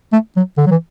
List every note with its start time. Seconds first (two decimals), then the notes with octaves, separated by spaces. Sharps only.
0.13 A3
0.37 F#3
0.58 D3
0.67 F#3
0.71 E3